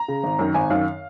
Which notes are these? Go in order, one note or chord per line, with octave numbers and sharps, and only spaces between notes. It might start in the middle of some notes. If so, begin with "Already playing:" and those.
Already playing: A#5
C#3
G#1
F#2 D#3
G#1 G#5
F#2 D#3 F5